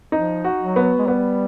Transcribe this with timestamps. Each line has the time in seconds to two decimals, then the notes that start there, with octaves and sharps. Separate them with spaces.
0.12 F3 D#4
0.44 F#4
0.60 F#3
0.76 B3
0.99 G#3
1.07 G3 B3